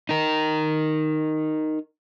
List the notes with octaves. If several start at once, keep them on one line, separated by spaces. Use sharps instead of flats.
D#4 A#4